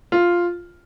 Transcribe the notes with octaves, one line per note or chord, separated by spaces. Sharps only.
F4